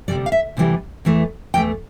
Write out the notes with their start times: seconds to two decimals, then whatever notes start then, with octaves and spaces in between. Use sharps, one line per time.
0.08 D2 C3 E3 G3 D5
0.26 F5
0.32 E5
0.57 D2 C3 E3 G3
1.05 E2 E3 A3
1.54 E2 E3 A3 G5